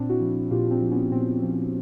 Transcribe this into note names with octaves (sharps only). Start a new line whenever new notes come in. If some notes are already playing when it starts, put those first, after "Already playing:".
Already playing: A#2 C4 D4
E4 F#4
F3
A#2 F4 G4
C4 D4
F3
B3 C#4
A#2 C4
F3